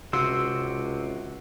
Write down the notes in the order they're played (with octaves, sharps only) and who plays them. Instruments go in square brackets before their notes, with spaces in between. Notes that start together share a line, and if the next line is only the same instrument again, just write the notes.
[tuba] C#2 [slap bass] C3 [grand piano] F#4 [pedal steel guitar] C6 E6